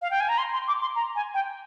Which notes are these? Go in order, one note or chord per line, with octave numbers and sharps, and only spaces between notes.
F5
G5
G#5
A#5
C6
C6
D6
C6
A#5
G#5
G5